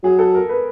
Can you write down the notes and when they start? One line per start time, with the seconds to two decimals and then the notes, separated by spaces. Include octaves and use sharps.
0.03 F#3 G#4
0.19 A4
0.35 A#4
0.49 B4